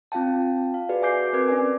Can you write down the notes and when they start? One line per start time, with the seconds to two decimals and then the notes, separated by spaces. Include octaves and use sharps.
0.12 C4 F4 F5 G5 A5
0.74 F5
0.89 F#4 G#4 B4 D5
1.02 E5 G#5 D6 G6 C7
1.33 C4 A#4 B4 D6 G#6
1.48 C#4 D5 G#5